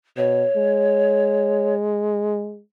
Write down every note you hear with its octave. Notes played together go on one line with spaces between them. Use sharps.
B2 C#5
G#3